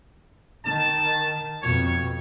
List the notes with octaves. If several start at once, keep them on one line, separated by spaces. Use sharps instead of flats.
D#3 A5
F2 B2 C#5